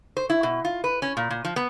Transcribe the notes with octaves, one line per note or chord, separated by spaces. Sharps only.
C5
E4
B2
F4
B4
C#4
A#2
A#2
F3
B3